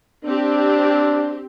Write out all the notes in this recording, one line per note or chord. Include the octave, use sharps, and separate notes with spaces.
C4 D4 G4